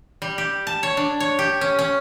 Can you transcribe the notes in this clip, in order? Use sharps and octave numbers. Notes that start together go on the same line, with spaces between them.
G3
G4
A5
C#5
D4
C#5
G4
C#4
C#4